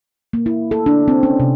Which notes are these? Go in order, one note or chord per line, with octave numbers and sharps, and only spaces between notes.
A#3
E4
A4
D4
C4
C#4
C3